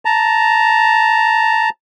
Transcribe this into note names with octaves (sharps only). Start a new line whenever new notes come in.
A5 A#5